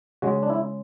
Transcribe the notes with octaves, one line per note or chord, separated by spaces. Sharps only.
C#3 G#3 F#4
D4
E4